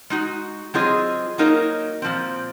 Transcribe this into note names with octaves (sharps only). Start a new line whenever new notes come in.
G#3 D#4 F#4
F#3 C4 F4 G#4 D#5
F#3 A#3 D#4 A#4 D#5
A#2 F3 C4